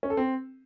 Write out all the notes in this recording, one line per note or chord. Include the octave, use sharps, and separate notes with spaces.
C#4
A4
C4